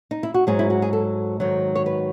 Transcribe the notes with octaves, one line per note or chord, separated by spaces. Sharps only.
D#4
E4
F#4
G#2 F#3 G#4
E4
F#4
G#4
A4
G#2 D#3 F#3
C#5
B4